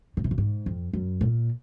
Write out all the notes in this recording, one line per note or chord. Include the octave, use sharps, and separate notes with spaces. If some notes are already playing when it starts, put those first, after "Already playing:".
C#3
C3
A#2
G#2
F2
F#2
A#2